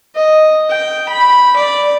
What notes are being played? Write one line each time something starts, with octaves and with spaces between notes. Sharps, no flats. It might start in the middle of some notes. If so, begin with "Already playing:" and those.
D#5
G5
B5
D5